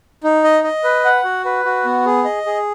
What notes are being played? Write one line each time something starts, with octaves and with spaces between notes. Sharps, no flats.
D#4
D#5
D#5
B4
F#5
F#4
B4
F#4
B3
G#4
D#5
G#4